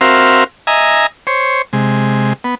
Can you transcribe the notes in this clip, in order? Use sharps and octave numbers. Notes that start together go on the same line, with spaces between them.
C4 F#4 A#4 C5 E5 F5
D#5 E5 G#5 A#5
C5 C#5
C3 G#3
B3